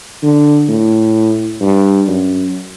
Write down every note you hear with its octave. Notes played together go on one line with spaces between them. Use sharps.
D3
A2
G2
F#2